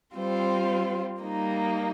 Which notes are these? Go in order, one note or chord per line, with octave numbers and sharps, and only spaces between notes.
G3 C4 F4 C5
G3 A#3 D#4